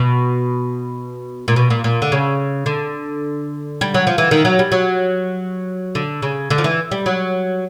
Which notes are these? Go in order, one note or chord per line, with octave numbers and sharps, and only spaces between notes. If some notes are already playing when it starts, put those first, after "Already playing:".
Already playing: B2
A#2
B2
A#2
A#2
D3
C#3
D3
G3
F#3
F3
E3
D#3
F#3
G3
F#3
D3
C#3
D3
F3
E3
G3
F#3